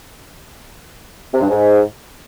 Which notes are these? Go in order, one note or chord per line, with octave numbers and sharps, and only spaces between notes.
C3
G2
G#2